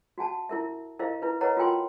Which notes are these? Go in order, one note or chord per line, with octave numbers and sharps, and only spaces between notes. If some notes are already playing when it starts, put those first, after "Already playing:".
F#4 F#5 G#5 A5
E4 A#4 E5
E4 A#4 C5 D#5 F5
E4 B4
A#4 B4 C#5 D#5 F#5 A#5
F4 F#4 A#4 G5 G#5 C6